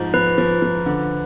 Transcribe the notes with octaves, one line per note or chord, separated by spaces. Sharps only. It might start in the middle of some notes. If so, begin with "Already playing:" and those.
Already playing: G#2 F3
F3 B4
F3
F3
D3